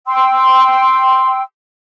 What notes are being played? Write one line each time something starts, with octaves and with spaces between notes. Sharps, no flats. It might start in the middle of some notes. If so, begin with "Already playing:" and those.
G5 C6 E6